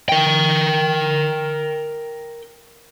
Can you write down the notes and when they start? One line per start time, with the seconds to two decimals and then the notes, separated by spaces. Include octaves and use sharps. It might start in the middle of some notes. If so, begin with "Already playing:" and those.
0.09 A#4 G5